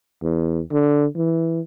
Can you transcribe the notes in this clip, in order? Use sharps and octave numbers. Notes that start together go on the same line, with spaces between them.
E2
D3
E3